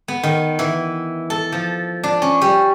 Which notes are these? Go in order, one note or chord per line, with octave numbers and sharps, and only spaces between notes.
B3
D#3
E3
A4
F3
D4
C#4
G3